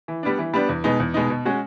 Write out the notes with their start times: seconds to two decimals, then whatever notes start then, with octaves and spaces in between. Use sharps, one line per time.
0.08 E3
0.23 G3 B3 D4
0.38 E3
0.54 G3 B3 D4
0.69 E2
0.84 B2 G#3 B3 D#4
1.00 E2
1.14 B2 G#3 B3 D#4
1.30 B2
1.45 G#3 C#4 F#4